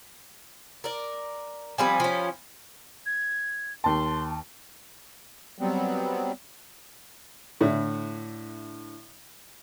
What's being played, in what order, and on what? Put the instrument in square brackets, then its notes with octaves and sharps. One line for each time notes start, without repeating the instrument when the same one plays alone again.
[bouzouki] A#4 D5
[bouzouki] F3 G3 C4 [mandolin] G#5 B5
[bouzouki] F3 C#4
[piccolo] G#6
[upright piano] D#2 A5 [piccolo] C6
[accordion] F#3 G3 B3 C4
[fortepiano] A2 D3 D4 E4